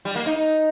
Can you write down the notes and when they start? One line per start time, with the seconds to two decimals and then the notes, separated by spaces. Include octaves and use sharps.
0.05 G3
0.16 A#3
0.26 D#4